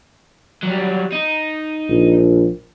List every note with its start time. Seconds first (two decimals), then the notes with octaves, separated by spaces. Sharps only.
0.63 F#3 G3
1.12 D#4
1.89 A#1